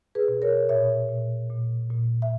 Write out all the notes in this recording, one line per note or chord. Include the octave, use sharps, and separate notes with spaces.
G#4 B4
B2
A#4 C#5
A#2 C#5 E5
A#2
A#2
A#2
E5